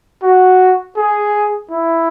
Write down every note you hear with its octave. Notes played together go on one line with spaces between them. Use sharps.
F#4
G#4
E4